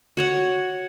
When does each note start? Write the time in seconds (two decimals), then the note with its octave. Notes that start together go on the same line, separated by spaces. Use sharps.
0.17 F#4 C#5 F#5